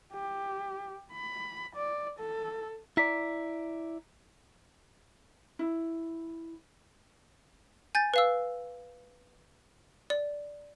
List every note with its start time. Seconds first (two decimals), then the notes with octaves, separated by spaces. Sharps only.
0.13 G4
1.12 B5
1.76 D5
2.20 A4
2.97 E4 D5 A#5 B6
5.59 E4
7.95 G#5 G6 A6
8.14 B4 F5 E6
10.10 D5